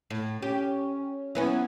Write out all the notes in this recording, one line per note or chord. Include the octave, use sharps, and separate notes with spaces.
A2
C#4 G4
F#3 B3 C#4 E4